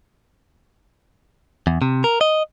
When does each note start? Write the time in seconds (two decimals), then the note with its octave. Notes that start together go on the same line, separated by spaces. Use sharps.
1.67 E2
1.82 C3
2.04 A#4
2.21 D#5